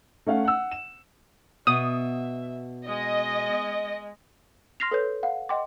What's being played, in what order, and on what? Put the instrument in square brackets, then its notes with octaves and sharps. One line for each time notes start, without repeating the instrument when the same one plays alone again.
[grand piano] A3 C#4 F5 F#5
F#5 E6
E7
[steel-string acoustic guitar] B2 [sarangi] E5 [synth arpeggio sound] D#6
[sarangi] G#3 [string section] D#5
[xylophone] C6 F6 A#6 C7 F7
A4 B4 C#5 G6
F5 F#5
D#5 F#5 G5 C6 D6